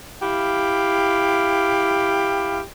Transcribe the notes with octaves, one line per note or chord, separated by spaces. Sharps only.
E4 G4 F5